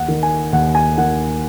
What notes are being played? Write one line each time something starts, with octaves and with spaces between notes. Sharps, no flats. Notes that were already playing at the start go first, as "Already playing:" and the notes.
Already playing: D#2 F#5
D#3
G#5
D#2 F#5
G#5
D#3 F#5